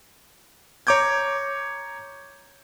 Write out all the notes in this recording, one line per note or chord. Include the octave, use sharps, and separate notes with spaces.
C#5 A#5 D6 G6 G#6